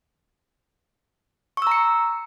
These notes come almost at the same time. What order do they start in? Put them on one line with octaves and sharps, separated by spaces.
C#6 E6 A#5 C#7